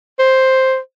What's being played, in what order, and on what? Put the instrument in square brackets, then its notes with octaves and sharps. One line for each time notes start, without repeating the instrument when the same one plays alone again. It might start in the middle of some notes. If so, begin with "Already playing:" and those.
[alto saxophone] C5